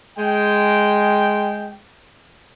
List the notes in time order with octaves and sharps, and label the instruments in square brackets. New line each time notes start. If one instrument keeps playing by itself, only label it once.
[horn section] G#3 G5